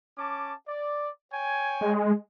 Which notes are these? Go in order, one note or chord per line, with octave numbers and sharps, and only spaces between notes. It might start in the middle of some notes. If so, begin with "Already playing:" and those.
C#4 A5 D6
D5
C#5 G5 G#5
G#3